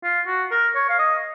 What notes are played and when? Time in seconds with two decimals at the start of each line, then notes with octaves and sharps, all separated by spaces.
0.03 F4
0.26 F#4
0.51 A#4
0.75 C#5
0.89 F5
0.99 D#5